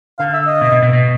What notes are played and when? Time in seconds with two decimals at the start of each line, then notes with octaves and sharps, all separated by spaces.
0.19 D3 F5
0.33 E5
0.47 D#5
0.61 B2
0.72 B2
0.82 B2
0.93 B2